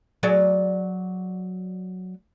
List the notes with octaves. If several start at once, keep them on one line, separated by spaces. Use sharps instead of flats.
F#3 G#4 D5